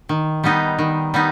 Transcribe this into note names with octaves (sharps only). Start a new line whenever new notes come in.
D#3
G3 B3 D#4
D#3
G3 B3 D#4